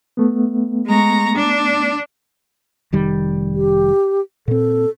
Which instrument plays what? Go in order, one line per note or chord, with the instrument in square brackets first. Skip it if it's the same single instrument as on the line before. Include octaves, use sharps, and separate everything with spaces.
[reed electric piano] A3 B3
[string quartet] G#3 A#5 C#6
D4
[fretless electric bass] F1 D#3 G3
[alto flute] G4
[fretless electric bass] A#2 C4 [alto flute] A4